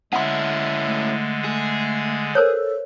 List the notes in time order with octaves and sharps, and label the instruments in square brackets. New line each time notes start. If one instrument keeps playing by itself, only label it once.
[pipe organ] D3 G#3 [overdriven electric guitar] C#4 E4 [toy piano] F#5 C6
[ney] A3
[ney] A3 [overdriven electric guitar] G#4
[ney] A4 [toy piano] A#4 C5 C#5